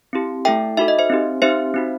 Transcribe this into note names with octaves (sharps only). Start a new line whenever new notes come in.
C4 E4 G4
A3 E4 A4 E5 G5
D#4 F#4 A4 E5
D#5
C5 E5
C4 D#4 G4
C4 D#4 G4 C5 E5
C4 D#4 F#4